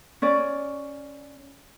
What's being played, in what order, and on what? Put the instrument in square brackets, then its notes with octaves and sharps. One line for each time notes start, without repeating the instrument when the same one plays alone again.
[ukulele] C#4 D5